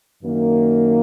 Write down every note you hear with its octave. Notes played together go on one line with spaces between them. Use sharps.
F#2 D#3 A#3